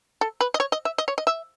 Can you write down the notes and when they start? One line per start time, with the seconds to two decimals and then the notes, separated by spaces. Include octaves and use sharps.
0.21 A4
0.41 B4
0.54 D#5
0.60 C#5
0.72 D#5
0.85 E5
0.98 D#5
1.08 C#5
1.18 D#5
1.27 E5